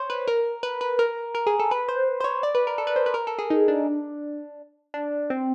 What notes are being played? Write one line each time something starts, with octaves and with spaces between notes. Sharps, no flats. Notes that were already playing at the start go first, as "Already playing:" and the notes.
Already playing: C5 C#5
B4
A#4
B4
B4
A#4
A#4
G#4
A4
B4
C5
C5
C#5
D5
B4
A#4
A4
B4
C5
B4
A#4
A4
G#4
D#4
D4
D4
C4